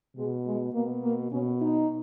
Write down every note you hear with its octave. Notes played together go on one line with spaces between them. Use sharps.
B2 G#3
G#3
B2 A#3
A#3
B2 C#4
D#4